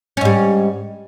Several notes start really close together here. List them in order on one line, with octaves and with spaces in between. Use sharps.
C#4 G#2 G3